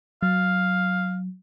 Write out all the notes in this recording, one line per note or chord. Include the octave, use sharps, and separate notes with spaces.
F#3 F5